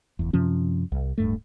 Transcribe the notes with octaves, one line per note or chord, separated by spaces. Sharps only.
F1 E2
F#2 C3 F3 C#4
C2
D1 G2 A3